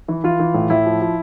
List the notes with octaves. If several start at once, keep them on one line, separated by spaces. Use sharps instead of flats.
E3
E3 F4
E3
A2
A2 E4
F3
F3